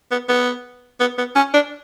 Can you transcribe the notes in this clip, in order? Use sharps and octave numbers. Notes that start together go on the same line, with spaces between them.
B3
B3
B3
B3
C#4
D4